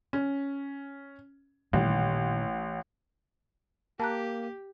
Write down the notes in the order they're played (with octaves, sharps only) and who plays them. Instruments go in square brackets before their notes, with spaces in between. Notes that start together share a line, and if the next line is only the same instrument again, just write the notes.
[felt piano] C#4
[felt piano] A1 [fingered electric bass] A#2 D#3 G3
[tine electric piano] A#3 [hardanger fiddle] G4 [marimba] A5 A#5 F#6